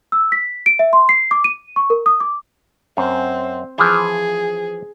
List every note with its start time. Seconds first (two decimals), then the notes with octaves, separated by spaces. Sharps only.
0.12 E6
0.32 B6
0.66 D7
0.79 E5
0.93 C6
1.09 C7
1.31 D6
1.44 D#7
1.76 C#6
1.90 A#4
2.06 D#6
2.20 D6
2.97 F#2 C4
3.78 E3 F3 G#4